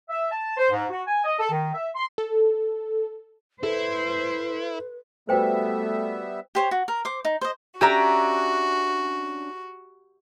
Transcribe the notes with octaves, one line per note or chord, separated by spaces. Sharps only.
E5
A5
C5
G#2
F#4
G#5
D#5
A4
D#3
E5
C6
A4
E4 A4 B4 C5
G3 A3 B3 F#4 B4 C5 E5 G5
G4 C5 C#5
F#4
A#4
C5 D6
D#4
C5 D#5
C#4 D4 F#4 G4 E5 A#5